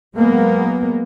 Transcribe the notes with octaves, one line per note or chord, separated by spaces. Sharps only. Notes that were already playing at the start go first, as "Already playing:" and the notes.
F#3 G#3 A#3 B3